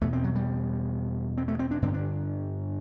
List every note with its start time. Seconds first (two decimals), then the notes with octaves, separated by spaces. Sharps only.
0.01 E2 B2 A3
0.13 C4
0.24 F#3
0.35 G3
1.38 C4
1.48 A3
1.59 C4
1.71 D4
1.82 G2 D3 C4
1.94 D4